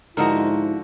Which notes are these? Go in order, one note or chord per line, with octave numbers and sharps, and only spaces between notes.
G#2 D3 F3 E4 F#4 A#4 D#5